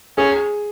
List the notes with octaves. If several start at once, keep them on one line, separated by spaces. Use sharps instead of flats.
C#4 G#4